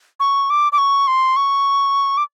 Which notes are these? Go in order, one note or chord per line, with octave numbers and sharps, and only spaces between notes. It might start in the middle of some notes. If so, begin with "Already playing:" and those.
C#6
D6
D6
C#6
C6
C#6
D6